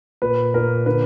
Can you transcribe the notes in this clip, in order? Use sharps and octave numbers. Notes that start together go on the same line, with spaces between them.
A#2 B4
A#2 A#4
D3 B4